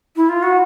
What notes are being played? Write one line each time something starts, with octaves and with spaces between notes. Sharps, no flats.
E4
F4
F#4